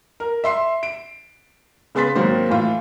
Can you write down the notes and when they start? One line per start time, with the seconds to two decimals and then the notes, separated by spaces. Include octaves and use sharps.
0.20 A#4
0.44 E5 C6 C7
0.83 D7
1.95 C#3 B3 G#4 C6 A6 B6
2.15 G#2 D#3 F#3 A#3 C4
2.49 A2 E3 F4